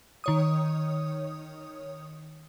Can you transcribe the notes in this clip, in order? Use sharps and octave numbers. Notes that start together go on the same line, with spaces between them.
D#3 C#5 D#6